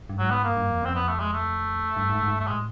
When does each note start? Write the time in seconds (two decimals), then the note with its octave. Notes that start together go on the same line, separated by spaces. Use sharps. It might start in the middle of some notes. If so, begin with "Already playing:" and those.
0.09 G2
0.19 G#2 F#3
0.31 B3
0.44 G2 A#3
0.56 G2
0.70 F2
0.82 F2 C4
0.95 F2 B3
1.08 A3
1.20 G#3
1.33 A3
1.97 G2
2.10 G#2
2.23 G#2
2.35 G2
2.40 A3
2.47 A2 G#3